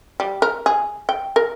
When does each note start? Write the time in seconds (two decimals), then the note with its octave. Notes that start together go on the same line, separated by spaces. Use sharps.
0.20 G3
0.42 A#4
0.66 G#4
1.09 G5
1.36 A#4